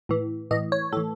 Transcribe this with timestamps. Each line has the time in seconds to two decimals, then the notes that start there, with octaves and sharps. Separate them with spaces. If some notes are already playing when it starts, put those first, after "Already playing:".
0.09 A2 E3
0.51 A2 E3 D#5
0.72 C#5
0.93 A2 E3 A4